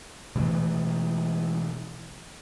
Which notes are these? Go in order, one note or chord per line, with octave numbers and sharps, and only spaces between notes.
B2 E3 A3